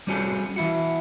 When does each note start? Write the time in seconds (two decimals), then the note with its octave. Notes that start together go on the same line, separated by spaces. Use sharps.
0.07 G3 C4 C#4 F#4 G#4 A4
0.56 E3 E4 F#4